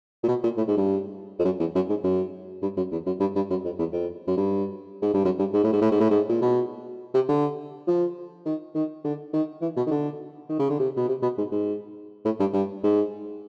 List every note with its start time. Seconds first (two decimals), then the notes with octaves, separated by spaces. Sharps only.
0.24 A#2
0.28 B2
0.44 A#2
0.57 A2
0.68 G#2
0.77 G2
1.39 F2
1.45 F#2
1.60 E2
1.75 F#2
1.89 G#2
2.04 F#2
2.62 G2
2.77 F#2
2.92 E2
3.06 F#2
3.20 G2
3.35 G2
3.50 F#2
3.64 F2
3.79 E2
3.93 F2
4.27 F#2
4.37 G2
5.02 G#2
5.14 G2
5.25 F#2
5.39 G2
5.53 G#2
5.64 A2
5.73 G#2
5.82 A2
5.91 G#2
6.00 A2
6.10 G#2
6.29 A#2
6.42 B2
7.14 C3
7.28 D3
7.87 F3
8.46 D#3
8.75 D#3
9.04 D3
9.33 D#3
9.62 E3
9.77 B2
9.86 D#3
9.91 D3
10.49 D#3
10.59 C#3
10.70 D3
10.79 C3
10.97 B2
11.08 C3
11.22 B2
11.38 G#2
11.52 G#2
12.25 A2
12.40 G2
12.53 G2
12.83 G#2